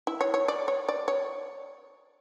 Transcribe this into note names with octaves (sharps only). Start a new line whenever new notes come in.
E4
C#5
C#5
D5
C#5
D5
C#5